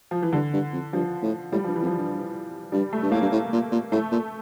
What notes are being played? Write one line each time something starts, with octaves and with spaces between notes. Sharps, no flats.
F3
E3
G2 D3
G2
F2
G2 F3
A2
A2 G3
G2 F3
E3
F2
F3
G2
G2 G3
A3
G2
A2 A#3
G2
A2
A#2
A#2
A2 A3
A#2